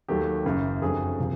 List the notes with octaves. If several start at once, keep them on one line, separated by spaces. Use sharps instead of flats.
D#2 D#3 F#3 A3 G4
F#1 F#2 C#3
F#1 F2 D3 F#3 G#4
C3 F3